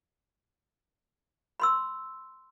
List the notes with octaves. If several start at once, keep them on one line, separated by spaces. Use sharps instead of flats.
B5 C6 E6